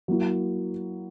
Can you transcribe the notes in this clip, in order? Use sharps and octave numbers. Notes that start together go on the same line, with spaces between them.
F#3 A#3 E4